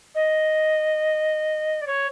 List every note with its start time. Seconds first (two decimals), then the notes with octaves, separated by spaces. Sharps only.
0.14 D#5
1.81 D5
1.86 C#5